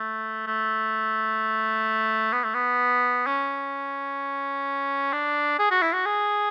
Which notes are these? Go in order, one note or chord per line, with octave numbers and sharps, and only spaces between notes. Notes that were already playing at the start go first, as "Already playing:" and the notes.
Already playing: A3
A3
B3
A3
B3
C#4
D4
G#4
F#4
E4
F#4
G#4